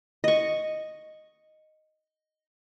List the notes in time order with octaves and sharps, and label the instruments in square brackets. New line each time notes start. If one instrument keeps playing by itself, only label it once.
[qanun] D#5 C#6